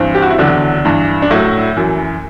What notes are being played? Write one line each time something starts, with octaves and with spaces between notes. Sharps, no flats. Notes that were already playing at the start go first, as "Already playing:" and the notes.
Already playing: G2 E3 C4
G4
F#4
E4
E2 D3 F#3 D4
G2 E3
D4
A2 F#3 E4
F#2 E3